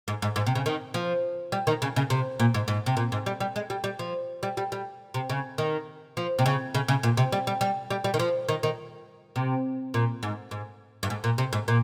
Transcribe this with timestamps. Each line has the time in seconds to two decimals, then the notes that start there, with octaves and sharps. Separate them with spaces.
0.08 G#2
0.22 G#2
0.36 G#2
0.46 C3
0.55 C#3
0.66 D#3
0.94 F3
1.52 G3
1.67 D#3
1.82 C#3
1.96 C#3
2.10 C3
2.39 A#2
2.54 G#2
2.68 G#2
2.86 C3
2.97 A#2
3.12 G#2
3.26 G3
3.40 G3
3.56 G#3
3.70 G3
3.84 G3
3.99 F3
4.43 G3
4.57 G3
4.72 G3
5.14 C3
5.30 C#3
5.58 D#3
6.17 F3
6.39 C3
6.46 C#3
6.75 C#3
6.88 C#3
7.03 A#2
7.17 C3
7.32 G3
7.47 G3
7.61 G3
7.90 G3
8.04 G3
8.14 D#3
8.19 F3
8.49 D#3
8.63 D#3
9.36 C3
9.94 A#2
10.23 G#2
10.51 G#2
11.03 G2
11.10 G#2
11.24 A#2
11.38 C3
11.53 G#2
11.68 A#2